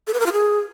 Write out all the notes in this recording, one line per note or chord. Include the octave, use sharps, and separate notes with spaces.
A4
B4
A#4
F4
G#4